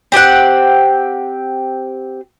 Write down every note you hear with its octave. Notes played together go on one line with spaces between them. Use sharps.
C4 G4 G#4 F#5